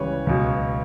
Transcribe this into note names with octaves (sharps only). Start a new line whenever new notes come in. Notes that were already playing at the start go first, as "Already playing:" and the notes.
Already playing: C#2 C#3 E3 G3 B4 C#5
C#2 B2 F#3